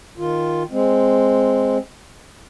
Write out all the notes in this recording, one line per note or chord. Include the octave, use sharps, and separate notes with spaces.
D#3 F4
G#3 C4